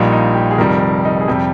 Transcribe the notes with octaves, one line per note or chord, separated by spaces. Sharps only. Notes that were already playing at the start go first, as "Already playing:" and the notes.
Already playing: A#1 A#2 G3 D#4
D#4
G4
G#4
F1 F2 D#3 G3 A#4
D#4
G#4
F2 C3 G3 G4